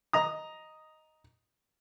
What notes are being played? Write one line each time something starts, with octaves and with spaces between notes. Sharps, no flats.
D#5 A#5 D#6